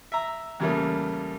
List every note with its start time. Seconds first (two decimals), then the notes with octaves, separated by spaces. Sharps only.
0.12 E5 A#5
0.60 E2 C#3 G3 A3 A#3